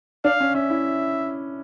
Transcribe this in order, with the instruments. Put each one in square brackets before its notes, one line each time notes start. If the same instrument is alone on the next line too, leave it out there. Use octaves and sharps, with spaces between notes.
[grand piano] D4 [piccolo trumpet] F5
[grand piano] C#4
[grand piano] C#4 [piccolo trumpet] E5
[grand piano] E4